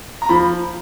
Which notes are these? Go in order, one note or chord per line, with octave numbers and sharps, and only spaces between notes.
A#5
F3 B5